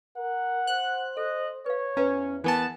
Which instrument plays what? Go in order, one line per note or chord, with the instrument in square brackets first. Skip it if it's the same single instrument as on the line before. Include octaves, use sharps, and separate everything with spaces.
[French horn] A#4 [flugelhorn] F#5
[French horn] C5 [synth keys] F#6
[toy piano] A4 [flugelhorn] D#5
[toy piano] B4 F5 [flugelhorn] C#5
[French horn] E2 [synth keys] C#4 [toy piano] B4 F5 A#5
[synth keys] E3 B3 A5 [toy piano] G#4 A#4 G#5